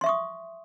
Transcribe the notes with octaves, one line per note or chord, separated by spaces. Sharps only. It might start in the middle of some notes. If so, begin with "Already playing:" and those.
E5 C6 C#6 D#6